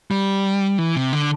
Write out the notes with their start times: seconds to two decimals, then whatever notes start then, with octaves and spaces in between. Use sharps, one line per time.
0.11 G3
0.78 E3
0.96 C3
1.13 D3